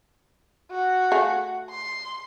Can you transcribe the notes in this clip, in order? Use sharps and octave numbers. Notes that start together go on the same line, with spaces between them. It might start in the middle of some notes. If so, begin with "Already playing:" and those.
F#4
A3 G#4 F5
C6